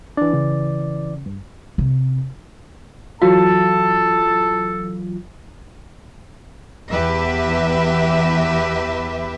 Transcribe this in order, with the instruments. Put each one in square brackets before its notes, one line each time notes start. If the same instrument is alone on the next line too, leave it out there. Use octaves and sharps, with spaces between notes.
[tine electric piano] E3 D5 [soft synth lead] D4
[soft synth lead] C#3
G2
[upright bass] C3
[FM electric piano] E3 F#3 F4 [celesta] F#4 [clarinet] A4 [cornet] A5
[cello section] E2 G4 B4 E5